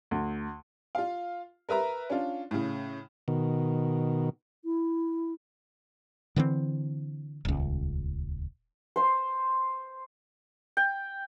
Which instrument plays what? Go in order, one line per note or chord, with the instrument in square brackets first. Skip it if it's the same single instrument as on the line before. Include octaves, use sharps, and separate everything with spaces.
[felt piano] D2
[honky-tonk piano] F4 F5
A#4 B4 E5 A#5
C#4 D4 F4
A2 C#3
[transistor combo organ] B2 D#3
[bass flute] E4
[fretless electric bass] D3 E3 B3 C4
D#1 C#2
[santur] C5 C6
G5